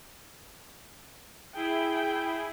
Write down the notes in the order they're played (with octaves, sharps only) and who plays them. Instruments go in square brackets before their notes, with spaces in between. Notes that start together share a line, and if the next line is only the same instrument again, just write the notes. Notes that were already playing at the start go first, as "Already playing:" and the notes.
[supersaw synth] E4 G#4 [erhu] G5